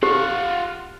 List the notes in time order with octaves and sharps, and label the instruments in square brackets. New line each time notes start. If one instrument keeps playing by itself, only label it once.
[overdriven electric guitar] F4 F#5 [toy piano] G4